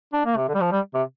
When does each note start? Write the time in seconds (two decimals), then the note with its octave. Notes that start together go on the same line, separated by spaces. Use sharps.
0.13 D4
0.25 A#3
0.37 C3
0.49 D3
0.54 G3
0.60 F3
0.72 G3
0.94 C3